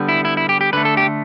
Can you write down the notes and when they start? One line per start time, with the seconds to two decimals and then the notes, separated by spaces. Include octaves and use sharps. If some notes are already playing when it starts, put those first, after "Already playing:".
Already playing: D3 G3 B3
0.09 E4
0.25 E4
0.37 E4
0.49 G4
0.61 G4
0.73 D3 A3 B4
0.85 A4
0.97 G4